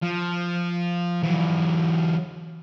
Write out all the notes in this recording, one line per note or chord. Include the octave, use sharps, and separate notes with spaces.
F3
E3 F#3